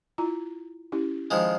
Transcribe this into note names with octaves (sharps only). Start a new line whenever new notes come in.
E4 F4 A#5
C#4 E4 G4
D#3 F3 G#3